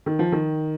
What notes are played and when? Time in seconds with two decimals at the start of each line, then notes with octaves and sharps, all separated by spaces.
0.06 D#3
0.19 F3
0.32 D#3